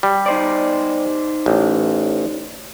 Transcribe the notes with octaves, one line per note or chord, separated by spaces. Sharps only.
G3
D#4 C5 D5
A1